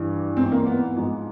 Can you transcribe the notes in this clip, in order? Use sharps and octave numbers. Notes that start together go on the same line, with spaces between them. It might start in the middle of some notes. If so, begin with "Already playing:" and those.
Already playing: G2 E3
G#2 E3 C4
A#3
B3
G#2 F3